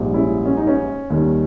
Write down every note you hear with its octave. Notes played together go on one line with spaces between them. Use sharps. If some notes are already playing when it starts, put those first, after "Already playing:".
Already playing: A#1 G#2 G3
C#4 E4
C#4
D#4
C#4
D#2 D#3 G3